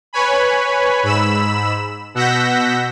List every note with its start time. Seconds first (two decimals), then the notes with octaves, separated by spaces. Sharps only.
0.13 B4 C#5 G#5 B5
1.03 G#2 B5 E6 E7
2.15 B2 F#5 E6 G6 A#6 B6